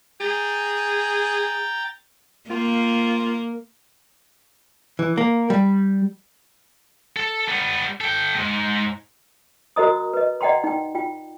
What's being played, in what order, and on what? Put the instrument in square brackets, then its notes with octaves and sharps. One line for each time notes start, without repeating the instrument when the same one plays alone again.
[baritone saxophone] G#4 [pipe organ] G5 A#5 A6
[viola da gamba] A#3 [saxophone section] C4 F4
[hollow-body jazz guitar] E3
A#3
G3
[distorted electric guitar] A4
G3 B3
A4 G5
D2 G#2
[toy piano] F#4 A#4 C5 D#5 A#5 D#6
B4 D#5
D5 D#5 F#5 G5 A#5 C6
D#4 G5
F4 G5